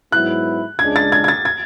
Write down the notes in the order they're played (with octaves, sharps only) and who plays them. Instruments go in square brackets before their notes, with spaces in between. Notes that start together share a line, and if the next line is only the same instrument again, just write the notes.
[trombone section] G#2 F#3 B3 E4 [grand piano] F#6
[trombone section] C#2 C#3 G#3 D4 G#4 [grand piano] G#6
[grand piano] A6
G#6
G#6
A6
G#6